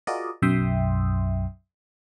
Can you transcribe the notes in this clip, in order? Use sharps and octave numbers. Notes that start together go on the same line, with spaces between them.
F4 F#4 G#4 A#4 D5 D#5
B1 F#2 E5 G5 C6 D#6